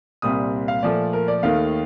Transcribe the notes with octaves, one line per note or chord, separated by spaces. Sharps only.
C2 A#2 G3 C4 D#6
F5
A#2 F3 A3 D5
A#4
D5
D#2 D#3 A3 F5